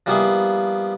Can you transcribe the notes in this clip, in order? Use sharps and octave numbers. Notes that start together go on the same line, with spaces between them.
F3 G3 A#3 B3 E4 G#4